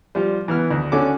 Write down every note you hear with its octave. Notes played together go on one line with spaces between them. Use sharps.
F3 G3
E3 B3 F6
D2
D3 C#4 F#4 A4 D6